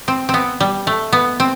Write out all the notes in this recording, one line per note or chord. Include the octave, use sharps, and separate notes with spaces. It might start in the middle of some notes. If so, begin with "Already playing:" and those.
C4
C4
B3
G3
A3
B3
C4